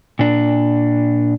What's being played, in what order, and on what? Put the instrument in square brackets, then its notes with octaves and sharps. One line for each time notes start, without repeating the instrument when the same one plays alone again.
[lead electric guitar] A#2 D4